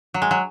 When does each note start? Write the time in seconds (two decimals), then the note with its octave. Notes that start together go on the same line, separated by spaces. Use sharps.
0.14 F#3
0.22 G#3
0.31 F#3